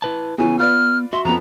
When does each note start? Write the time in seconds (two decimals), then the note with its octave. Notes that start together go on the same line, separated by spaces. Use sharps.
0.02 E4 B4 A5
0.38 C#3 E3 B3 G#5
0.59 F4 B4 D5 F6
1.13 F#4 E5 C6
1.25 F2 B3 A#5